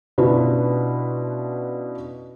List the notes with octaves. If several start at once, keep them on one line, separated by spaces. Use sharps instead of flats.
B2 C#4 D4 E4 F4 B4